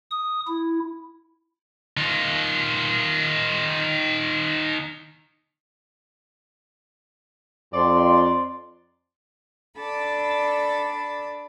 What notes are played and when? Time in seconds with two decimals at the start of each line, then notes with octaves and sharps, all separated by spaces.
0.11 D#6
0.47 E4
1.97 D#3 F4
7.73 F2 D5 C6
9.78 D4 A4 D5 A5 B5